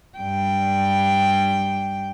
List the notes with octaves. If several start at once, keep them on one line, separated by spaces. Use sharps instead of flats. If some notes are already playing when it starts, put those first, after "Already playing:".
G2 G5